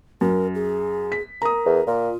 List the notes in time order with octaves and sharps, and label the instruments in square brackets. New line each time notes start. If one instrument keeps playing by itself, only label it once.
[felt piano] F#2 [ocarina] A#4
[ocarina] G#4
[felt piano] B6
[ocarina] A#4 [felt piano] A#5 D#6
[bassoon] E2
[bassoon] A#2 [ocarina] F4